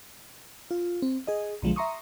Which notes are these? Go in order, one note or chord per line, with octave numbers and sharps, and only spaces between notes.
F4
C4
G#4 D#5
B1 D3 F3 G#3
E5 A#5 C6 C#6 D#6